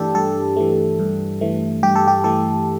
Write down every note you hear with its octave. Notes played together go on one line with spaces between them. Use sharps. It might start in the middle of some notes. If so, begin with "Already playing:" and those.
Already playing: G2 E3 A3 D4 G4 A4
G2 A4
E3 A3
G2
E3 A3
G2 G4
A4
G4
E3 A3 A4